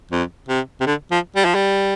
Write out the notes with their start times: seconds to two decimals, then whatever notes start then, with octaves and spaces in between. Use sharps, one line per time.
0.12 F2
0.49 C3
0.81 C3
0.87 D3
1.11 F3
1.36 G3
1.45 F3
1.55 G3